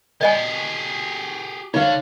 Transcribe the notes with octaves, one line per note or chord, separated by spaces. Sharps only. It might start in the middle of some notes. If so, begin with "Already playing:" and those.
G4 G#4 D5 D#5 G#5
D3 D#4 C#5 F5